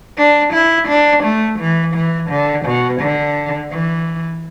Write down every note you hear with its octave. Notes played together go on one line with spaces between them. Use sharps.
D4
E4
D4
A3
E3
E3
D3
B2
D3
E3